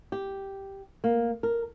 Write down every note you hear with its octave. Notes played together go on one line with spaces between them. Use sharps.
G4
A#3
A#4